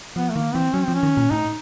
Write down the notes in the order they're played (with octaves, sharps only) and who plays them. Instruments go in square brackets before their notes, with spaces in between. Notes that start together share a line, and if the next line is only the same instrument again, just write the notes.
[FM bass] F3 [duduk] B3
[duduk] A3
[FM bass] D#3 [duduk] A#3
[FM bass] E3 [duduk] C4
[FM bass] F#3 [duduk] C#4
[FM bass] F3 [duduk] C4
[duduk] C#4
[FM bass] D#3
A#2
[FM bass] A2 [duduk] D#4